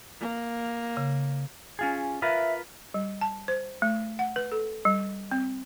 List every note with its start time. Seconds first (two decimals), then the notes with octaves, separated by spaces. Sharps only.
0.20 A#3
0.97 C#3
1.79 C#4 F4 G#4
2.22 F4 A#4 B4 E5
2.94 G3
3.21 A5
3.48 C5
3.82 A3
4.19 F#5
4.36 B4
4.52 A4
4.85 G3
5.31 C4